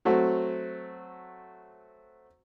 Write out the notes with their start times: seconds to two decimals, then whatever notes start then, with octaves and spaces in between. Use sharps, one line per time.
0.05 F#3 A3 C4 F#4